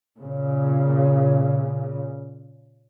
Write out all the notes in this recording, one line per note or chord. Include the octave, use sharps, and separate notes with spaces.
A#2 C#3